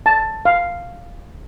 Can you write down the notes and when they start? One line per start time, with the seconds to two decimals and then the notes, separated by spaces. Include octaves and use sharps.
0.06 A5
0.45 F5